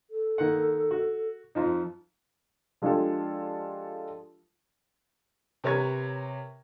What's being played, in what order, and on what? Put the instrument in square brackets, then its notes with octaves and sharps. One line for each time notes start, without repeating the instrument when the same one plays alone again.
[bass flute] A4
[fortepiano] D#3 A#3 F#5
F#4
F2 F3 D#4
[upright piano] F3 G#3 D4 F4 G4 A4
C3 A#4 B4 C#5 C#6 G#6